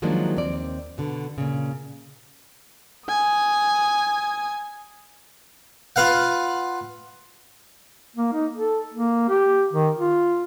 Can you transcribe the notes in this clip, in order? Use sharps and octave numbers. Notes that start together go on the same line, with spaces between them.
D#3 F3 F#3 G#3 A#3 D4
D#2 C4 D5
B2 D3
A#2 C#3
G#5 D#6
F4 B4 F5 F#5
A#3
D#4
A4
A#3
G4
D#3
F4